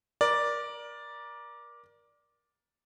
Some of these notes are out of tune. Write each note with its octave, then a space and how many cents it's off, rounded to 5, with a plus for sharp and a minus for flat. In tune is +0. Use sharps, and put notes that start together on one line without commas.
A#4 +25 D5 +0